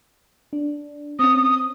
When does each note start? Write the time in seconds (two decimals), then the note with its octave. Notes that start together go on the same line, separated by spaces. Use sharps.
0.53 D4
1.19 C4 C#4 D#6